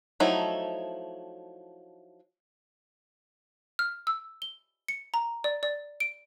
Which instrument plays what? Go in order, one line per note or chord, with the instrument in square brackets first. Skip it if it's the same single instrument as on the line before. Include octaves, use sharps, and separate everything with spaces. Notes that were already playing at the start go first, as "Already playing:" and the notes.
[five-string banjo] F3 F#3 A3 D#4 E4
[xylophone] F6
E6
G7
C#7
A#5
D5
D5
D7